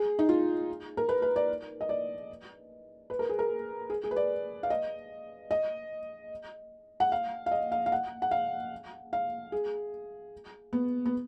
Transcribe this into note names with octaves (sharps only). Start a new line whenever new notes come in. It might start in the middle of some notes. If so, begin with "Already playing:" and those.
Already playing: G#4
D#4
F4
A#4
B4
B4
D5
D#5
D5
B4
A#4
G#4
A#4
G#4
G#4
B4
D5
F5
D#5
D#5
F#5
F5
F5
D#5
F5
F5
F#5
F#5
F5
F5
G#4
B3
B3